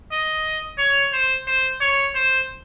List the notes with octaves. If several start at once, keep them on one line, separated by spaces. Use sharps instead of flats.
D#5
C#5
C5
C5
C#5
C5